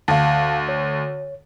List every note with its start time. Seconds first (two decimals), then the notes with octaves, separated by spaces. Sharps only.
0.08 D2 F5 A5
0.69 C#5